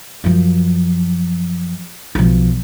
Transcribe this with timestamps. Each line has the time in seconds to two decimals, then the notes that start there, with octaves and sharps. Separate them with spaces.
0.24 F#2 F3
2.15 B1 F3